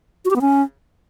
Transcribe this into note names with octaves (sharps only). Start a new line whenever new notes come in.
F#4
G4
B3
C#4